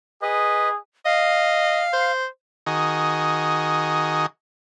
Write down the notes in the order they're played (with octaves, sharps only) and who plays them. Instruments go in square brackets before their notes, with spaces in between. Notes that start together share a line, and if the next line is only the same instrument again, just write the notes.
[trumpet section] G#4 [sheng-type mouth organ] B4 D#5
[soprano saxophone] D#5 [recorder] F5
[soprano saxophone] C5
[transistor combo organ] D#3 F#4 G#4 D#5